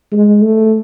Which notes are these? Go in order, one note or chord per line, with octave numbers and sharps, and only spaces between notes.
G#3
A3